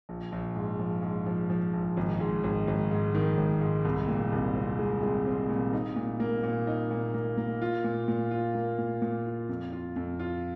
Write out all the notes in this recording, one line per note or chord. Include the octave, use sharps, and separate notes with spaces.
A#1
A#1
G#2
F3
G#2
F3
F3
A#1
G#1
G#2
G#1
G#1
G#2
D#3
G#1
G#2
C2
A#2
C2
C4
G#3
G#3
C4
A#2
D#4
A#2
A#3
A#2
D#4
A#2
A#3
A#3
F4
A#2
A#2
F4
A#3
A#2
A#2
F4
F2
F4
F2
F4